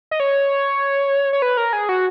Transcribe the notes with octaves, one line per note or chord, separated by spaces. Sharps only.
D#5
C#5
C#5
B4
A#4
G#4
F#4